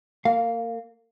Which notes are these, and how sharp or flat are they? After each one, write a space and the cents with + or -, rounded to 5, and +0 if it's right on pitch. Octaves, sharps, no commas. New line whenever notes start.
A#3 -25 F5 +0